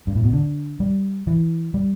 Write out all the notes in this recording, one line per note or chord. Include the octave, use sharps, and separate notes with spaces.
G2
A2
B2
D3
G3
E3
G3